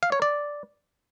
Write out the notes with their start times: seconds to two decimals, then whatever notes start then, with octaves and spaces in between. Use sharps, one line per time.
0.03 F5
0.12 C#5
0.22 D5